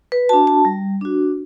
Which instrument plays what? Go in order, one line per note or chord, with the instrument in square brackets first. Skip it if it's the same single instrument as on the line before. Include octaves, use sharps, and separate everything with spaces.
[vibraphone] B4
D4 F#4 A5
A5
G3
D4 F#4